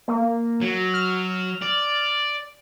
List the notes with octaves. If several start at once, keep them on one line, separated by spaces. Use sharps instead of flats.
A#3
F#3
F6
D5